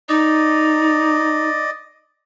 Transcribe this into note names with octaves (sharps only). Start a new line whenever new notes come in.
D#4 D5 D#5